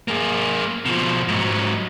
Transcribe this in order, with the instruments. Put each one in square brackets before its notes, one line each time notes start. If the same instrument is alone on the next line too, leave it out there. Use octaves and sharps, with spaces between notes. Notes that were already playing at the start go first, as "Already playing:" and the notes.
[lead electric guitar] A#3 G#4
B2 F3
G#2 F#3